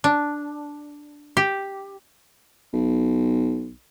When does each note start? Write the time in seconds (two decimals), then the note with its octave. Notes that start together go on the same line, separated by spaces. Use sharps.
0.04 D4
1.37 G4
2.73 B1